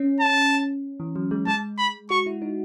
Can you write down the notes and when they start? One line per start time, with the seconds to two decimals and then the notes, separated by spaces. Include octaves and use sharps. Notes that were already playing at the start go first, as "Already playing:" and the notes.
Already playing: C#4
0.20 A5
1.00 E3
1.16 F#3
1.31 G#3
1.47 G#3 A5
1.78 B5
2.10 F#4 C#6
2.26 E4
2.42 D#4